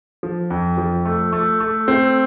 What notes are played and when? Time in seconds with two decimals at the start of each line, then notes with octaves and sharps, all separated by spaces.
0.23 F3
0.50 F2
0.78 F3
1.05 A3
1.32 A3
1.60 A3
1.88 C4